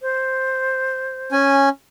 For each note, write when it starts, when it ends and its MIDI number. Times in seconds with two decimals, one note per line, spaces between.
0.02 1.35 72
1.32 1.69 61
1.32 1.69 80